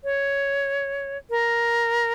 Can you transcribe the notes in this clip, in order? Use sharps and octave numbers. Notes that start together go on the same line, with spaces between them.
C#5
A#4